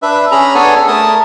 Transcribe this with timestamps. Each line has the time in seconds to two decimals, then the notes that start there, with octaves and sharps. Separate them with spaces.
0.02 D4 B4 E5
0.31 C#4 G#4 A#5 B5
0.55 B3 D4 G#4 A4 C#5 G#5
0.88 A3 A#4 A5 D#6